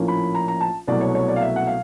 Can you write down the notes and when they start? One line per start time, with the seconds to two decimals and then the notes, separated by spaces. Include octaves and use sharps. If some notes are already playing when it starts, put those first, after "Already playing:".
Already playing: A#1 A2 F3 A#3 C#4
0.08 B5
0.35 A#5
0.48 A#5
0.61 A5
0.87 C2 B2 F#3 A3 D5
1.01 C#5
1.15 C#5
1.28 D5
1.36 F5
1.41 E5
1.56 F#5
1.67 F5